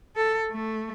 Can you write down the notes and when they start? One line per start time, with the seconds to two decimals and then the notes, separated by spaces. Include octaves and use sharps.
0.16 A4
0.51 A3